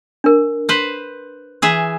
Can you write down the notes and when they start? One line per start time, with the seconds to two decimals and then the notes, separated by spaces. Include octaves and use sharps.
0.24 D4 A#4
0.69 B4 C5
1.62 E3 G#4 E5